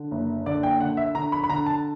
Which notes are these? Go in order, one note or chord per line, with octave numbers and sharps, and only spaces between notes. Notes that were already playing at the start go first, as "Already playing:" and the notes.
Already playing: D3
F#1
D3 D5
G5
D3 F#5
E5
D3 A#5
B5
B5
D3 A#5
A5